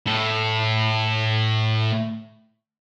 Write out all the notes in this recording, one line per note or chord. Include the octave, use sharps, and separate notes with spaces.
A2 A4